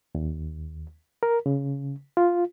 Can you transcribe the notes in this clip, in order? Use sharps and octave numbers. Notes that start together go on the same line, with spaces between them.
D#2
A#4
C#3
F4